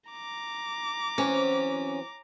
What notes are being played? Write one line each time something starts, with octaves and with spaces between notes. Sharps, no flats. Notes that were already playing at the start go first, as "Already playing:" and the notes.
A#5 D6
E3 F#3 C4 C#4